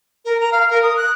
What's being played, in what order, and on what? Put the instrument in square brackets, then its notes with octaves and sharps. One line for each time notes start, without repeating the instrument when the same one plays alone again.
[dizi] A#4
A#5
F5
A#4
D#6
F#6